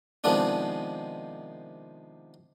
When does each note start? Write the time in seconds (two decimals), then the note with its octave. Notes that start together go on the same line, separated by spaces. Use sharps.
0.24 C3 D#3 F3 G#3 B3 D4